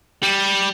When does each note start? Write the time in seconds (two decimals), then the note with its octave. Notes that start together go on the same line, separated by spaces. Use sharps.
0.23 G3